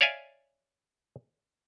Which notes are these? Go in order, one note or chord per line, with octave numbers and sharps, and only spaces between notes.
C#5 D5 E5 F5 G#5